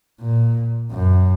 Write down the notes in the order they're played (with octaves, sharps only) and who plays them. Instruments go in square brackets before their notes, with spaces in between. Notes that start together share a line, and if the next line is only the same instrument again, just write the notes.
[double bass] A#2
F#2